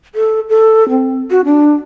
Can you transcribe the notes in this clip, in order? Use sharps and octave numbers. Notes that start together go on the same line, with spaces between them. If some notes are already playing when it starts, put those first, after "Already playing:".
A4
A4
C4
F#4
D4